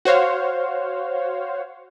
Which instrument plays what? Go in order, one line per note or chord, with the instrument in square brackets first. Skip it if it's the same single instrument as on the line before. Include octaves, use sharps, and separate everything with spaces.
[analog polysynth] F#4 C5 C#5 F5